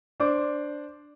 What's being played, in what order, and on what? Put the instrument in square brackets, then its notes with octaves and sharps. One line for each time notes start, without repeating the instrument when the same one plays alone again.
[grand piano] D4 C5 D5 D6